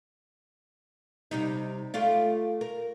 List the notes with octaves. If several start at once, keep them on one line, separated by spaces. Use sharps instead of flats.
C3 G3 D#4
A3 F4 D5
A#4